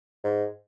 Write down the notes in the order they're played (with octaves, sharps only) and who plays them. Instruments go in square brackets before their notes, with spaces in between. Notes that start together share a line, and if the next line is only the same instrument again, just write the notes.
[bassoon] G#2